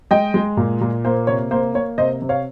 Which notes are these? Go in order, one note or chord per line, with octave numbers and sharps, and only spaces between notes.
G#3 D#5 G5
G#3
A#2
A#2
A#3 C5
C3 C#5
A#3 C5
A#3 C#5
C3 C5 D#5
C3
C#5 F5